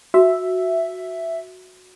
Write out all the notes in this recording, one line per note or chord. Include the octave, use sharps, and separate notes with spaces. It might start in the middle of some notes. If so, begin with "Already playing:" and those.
F#4 E5